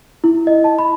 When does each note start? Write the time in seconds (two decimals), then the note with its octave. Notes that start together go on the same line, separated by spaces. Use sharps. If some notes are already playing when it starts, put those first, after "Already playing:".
0.24 E4
0.47 D#5
0.64 A5
0.79 B5